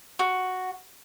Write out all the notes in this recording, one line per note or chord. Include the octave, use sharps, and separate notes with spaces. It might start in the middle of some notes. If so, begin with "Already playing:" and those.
F#4